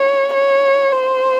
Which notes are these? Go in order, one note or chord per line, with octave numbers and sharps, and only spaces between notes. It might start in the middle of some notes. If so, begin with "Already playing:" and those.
Already playing: C#5
C#5
C5